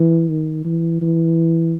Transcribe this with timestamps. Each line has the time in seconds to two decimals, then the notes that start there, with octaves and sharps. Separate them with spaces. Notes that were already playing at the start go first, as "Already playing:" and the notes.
Already playing: E3
0.30 D#3
0.65 E3
1.01 E3